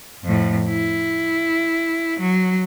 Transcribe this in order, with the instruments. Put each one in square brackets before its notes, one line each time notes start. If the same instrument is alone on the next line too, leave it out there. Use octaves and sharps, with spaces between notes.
[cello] F2 A2
E4
F#3